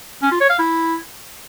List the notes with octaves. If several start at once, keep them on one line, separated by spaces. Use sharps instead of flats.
C#4
F4
C#5
F5
E4